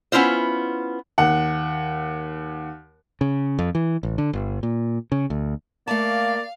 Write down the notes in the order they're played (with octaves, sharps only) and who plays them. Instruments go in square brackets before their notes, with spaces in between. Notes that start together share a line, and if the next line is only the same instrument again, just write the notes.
[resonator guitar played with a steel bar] B3 C#4 E4 F4 C5
[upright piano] D#2 F#5
[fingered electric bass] C#3
F2
E3
A1
D3
G1
A#2
C#3
D2
[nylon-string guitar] A3 A5 [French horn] A#3 [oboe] D5 [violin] F5